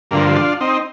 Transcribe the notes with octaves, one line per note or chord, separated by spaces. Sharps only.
G2 D3 F3 A#3
D4 F4
C4 D#4